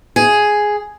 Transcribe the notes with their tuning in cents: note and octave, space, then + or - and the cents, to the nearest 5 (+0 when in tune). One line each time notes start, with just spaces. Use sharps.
G#4 +5